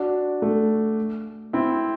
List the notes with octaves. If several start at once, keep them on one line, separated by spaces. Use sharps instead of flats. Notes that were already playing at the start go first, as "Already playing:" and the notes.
Already playing: D4 F#4
A3
C4 E4